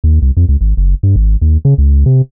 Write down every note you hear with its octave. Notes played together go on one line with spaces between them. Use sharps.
D#2
C2
F2
C#2
G#1
F#1
G2
G#1
D#2
C#3
C#2
C3